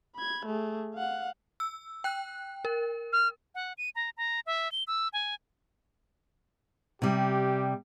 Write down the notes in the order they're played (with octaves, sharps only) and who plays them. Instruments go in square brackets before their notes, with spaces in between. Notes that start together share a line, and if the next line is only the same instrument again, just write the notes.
[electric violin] B5 G#6
A3 G#4
F5 F#5
[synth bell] E6
G5 F#6
A#4
[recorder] F6
[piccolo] F#5
D#7
A#5
A#5
E5
G7
E6
G#5
[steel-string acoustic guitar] C3 G3 [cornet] G4